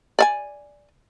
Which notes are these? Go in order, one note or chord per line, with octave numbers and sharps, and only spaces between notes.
D5 E5 G#5